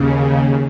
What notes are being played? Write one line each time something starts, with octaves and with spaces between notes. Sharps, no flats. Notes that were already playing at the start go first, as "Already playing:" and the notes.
Already playing: D#2 C#3